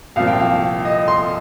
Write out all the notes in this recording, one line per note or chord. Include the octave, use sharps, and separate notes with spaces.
C2 A#2 F3 F5
G5
F5
D#5
C6